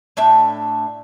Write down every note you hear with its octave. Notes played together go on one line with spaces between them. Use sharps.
A2 D4 E5 G5